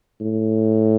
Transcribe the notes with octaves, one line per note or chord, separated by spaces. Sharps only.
A2